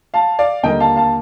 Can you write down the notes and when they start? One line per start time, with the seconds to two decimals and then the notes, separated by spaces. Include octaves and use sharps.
0.14 F5 A5
0.39 D5 F5
0.63 D#2 D3 G3 A#3 D#5 G5
0.80 F5 A5
0.96 F5 A5